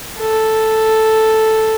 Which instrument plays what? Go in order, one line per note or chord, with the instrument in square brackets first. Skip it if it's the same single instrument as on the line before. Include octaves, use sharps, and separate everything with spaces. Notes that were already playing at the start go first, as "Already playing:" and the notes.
[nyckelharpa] A4